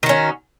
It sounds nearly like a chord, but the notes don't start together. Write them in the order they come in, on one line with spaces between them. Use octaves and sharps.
D#3 F#4 C#4